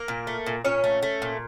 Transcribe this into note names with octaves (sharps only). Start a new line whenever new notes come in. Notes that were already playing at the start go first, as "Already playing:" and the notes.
Already playing: A#3 A#4
A#2
A3
A#2
A#2 C#4 C#5
A3
A3
A#2